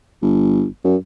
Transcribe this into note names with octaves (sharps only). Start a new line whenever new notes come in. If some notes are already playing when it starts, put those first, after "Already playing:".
G1
F#2